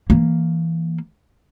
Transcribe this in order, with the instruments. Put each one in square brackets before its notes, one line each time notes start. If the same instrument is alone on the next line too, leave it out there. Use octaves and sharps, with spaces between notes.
[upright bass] E3 A#3